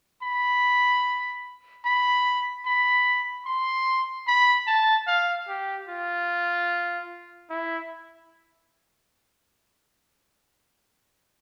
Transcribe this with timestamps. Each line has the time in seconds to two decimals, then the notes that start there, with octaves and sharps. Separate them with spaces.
0.23 B5
1.85 B5
2.66 B5
3.46 C6
4.27 B5
4.67 A5
5.07 F5
5.48 G4
5.89 F4
7.50 E4